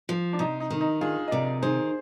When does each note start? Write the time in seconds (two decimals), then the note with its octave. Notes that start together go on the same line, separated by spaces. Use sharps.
0.09 F3
0.33 D4
0.39 C3 D#4
0.60 D#4
0.70 D#3
0.81 D#4
1.01 D4 F4 G#4
1.28 D#5
1.31 C3 A#4 D5
1.62 D#3 G#4 C5